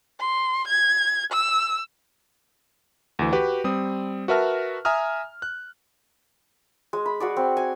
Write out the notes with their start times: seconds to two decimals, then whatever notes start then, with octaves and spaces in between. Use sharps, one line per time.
0.20 C6
0.67 G#6
1.32 E6
3.19 D2 E3
3.32 F#4 G4 B4
3.64 G3 C4 D#6
4.28 F#4 A#4 B4 E5 A5 F6
4.85 E5 G#5 A#5 D#6 F6
5.42 F#6
6.93 G#3
7.06 B5
7.20 F#4 G#4 D5
7.37 C4
7.57 G#5